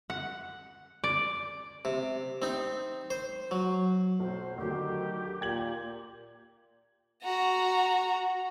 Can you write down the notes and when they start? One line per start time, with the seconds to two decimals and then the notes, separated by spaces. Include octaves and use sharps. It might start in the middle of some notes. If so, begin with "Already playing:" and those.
0.10 F#5
1.04 D5
1.85 C3
2.42 C4 D#4
3.10 C5
3.51 F#3
4.20 B1 C5
4.58 D2 D#3 F#3 G4
5.41 A#2 G5 G#6 F#7
7.24 F#4 A#5